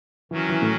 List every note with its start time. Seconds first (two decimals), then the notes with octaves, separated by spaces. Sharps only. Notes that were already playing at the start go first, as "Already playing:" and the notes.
0.31 D#3 E3 F#3 C#4 F#4
0.49 E3
0.62 A2